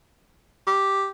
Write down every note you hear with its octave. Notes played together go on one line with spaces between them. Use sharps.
G4